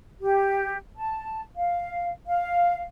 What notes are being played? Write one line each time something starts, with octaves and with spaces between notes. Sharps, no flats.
G4
A5
F5
F5